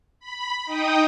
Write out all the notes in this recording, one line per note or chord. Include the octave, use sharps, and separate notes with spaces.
B5
D#4 G5 D#6